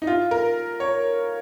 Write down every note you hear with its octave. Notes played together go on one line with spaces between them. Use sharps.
D#4
F4
A#4
C#5